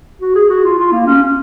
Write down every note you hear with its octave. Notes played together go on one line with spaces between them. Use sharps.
F#4
G#4
F#4
F4
F4
A#3
C#4
C#4